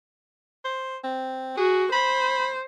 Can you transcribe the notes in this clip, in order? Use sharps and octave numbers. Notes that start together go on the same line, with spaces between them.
C5
C4
F#4 G#4
C5 B5